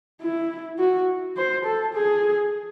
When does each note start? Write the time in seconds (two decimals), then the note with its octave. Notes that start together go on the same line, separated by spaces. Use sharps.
0.21 E4
0.79 F#4
1.37 C5
1.65 A4
1.94 G#4